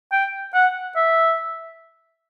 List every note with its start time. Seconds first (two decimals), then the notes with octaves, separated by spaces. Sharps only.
0.12 G5
0.54 F#5
0.96 E5